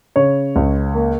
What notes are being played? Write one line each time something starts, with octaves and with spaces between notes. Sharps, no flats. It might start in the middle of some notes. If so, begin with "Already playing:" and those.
C#3 C#5
C#2
A#3